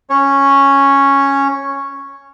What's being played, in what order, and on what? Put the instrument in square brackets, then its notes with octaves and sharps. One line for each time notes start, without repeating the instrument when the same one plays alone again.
[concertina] C#4 C#5